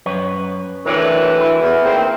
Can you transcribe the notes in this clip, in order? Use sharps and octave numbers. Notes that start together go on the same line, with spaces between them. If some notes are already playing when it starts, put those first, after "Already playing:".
F#2 B4 C#5
D2 A2 E3 A#4 C#5 D5
E4
E2
D#3 A#3 C4